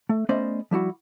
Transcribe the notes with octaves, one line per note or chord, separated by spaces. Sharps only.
A3
A3 B3 C#4 C5 D5 D#5
F3 G3 E4 F#4